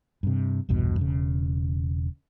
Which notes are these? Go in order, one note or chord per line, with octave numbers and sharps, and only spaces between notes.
G2 C3
A#1 E2 G2 B2
E1 C#3